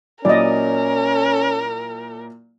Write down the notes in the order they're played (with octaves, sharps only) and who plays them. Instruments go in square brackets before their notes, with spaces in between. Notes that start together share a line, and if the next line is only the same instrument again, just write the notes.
[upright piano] A#2 F#3 E4 [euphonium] C#4 [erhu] A#4 [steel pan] D5 D#5